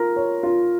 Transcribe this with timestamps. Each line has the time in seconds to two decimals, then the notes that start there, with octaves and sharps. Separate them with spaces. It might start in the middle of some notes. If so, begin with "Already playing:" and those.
Already playing: F4 A#4
0.16 C#5
0.43 F4